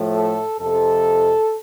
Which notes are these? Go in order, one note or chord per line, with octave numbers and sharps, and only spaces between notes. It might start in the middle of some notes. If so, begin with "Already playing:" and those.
Already playing: A2 F3 A3
A4
F2 C3 F3 A4